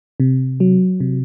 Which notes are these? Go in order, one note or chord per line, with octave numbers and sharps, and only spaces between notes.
C3
F#3
C3